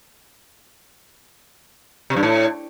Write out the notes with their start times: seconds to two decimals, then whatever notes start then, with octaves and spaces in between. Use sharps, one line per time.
2.10 C3
2.16 G2
2.23 A2